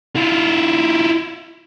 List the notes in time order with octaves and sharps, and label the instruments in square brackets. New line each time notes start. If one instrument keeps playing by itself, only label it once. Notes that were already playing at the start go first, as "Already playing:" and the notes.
[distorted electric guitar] E4 F4